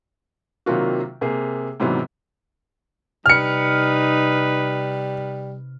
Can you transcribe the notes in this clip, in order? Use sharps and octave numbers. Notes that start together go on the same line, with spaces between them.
C3 D#3 F#3 A#3 F4 F#4
C3 A#3 G#4
G#2 C3 E3 F#3 B3
C3 G3 D#4 B4 F6 C#7